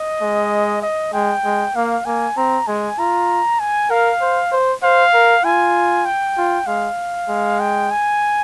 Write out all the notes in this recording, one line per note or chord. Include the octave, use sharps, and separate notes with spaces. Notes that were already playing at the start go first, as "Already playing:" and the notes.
Already playing: D#5
G#3
D#5
G#3 G5
G#3
A#3 F5
A#3 G#5
C4 A#5
G#3 G#5
F4 A#5
G#5
A#4 F5
C5
C5
C5 F5
A#4
F4 G#5
G5
F4
G#3 F5
G#3
G5
G#5